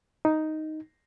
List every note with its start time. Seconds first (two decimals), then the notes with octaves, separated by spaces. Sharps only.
0.25 D#4